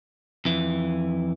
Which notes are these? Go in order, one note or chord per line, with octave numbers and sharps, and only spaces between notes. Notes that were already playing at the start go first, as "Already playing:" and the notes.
F2 E3